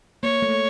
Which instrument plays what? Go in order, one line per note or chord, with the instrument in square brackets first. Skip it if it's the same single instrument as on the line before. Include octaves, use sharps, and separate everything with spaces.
[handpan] A#3 [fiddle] C#5
[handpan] A3